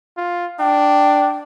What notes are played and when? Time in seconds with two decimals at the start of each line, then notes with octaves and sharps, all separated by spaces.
0.17 F4
0.59 D4 G5